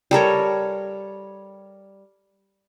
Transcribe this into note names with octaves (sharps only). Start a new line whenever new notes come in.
G3 A4 A#4 C#5